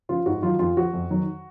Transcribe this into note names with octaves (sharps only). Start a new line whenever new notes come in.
C#3 F3 F4
G#2 F#4
D#3 F#3 F4
F2 F4
F3 F#4
F2
D#3 F#3